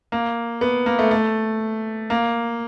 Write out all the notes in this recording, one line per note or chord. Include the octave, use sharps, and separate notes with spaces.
A#3
B3
A#3
A3
A3
A#3